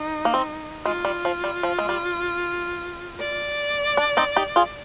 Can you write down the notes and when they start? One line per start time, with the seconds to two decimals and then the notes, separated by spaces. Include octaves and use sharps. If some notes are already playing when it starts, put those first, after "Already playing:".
Already playing: D#4
0.25 A#3
0.34 C4
0.85 G#3 F4
1.05 G3
1.25 F3
1.44 G3
1.63 F3
1.79 G#3
1.89 G3
3.20 D5
3.97 D4
4.17 C4 D#4
4.36 D#4 G4
4.56 F4 G#4